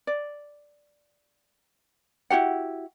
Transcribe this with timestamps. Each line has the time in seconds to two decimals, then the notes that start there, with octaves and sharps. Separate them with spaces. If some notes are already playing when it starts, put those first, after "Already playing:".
0.07 D5
2.30 E4 F#4 G4 F#5